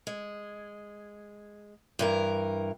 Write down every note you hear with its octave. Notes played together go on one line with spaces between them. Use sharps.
G#3
G2 E3 A#4